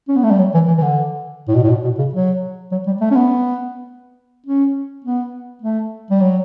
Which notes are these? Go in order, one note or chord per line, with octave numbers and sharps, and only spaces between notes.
C#4
B3
A3
G3
F#3
E3
E3
E3
D3
A2
B2
A2
B2
B2
C#3
F#3
F#3
G3
A3
C#4
B3
C#4
B3
A3
G3
F#3